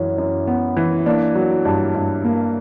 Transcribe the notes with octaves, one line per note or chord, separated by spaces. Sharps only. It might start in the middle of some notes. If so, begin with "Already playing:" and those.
Already playing: F#2 E3 C#4
F#2
B3
E3
A#3 D4
F#3
G2
G2
A#3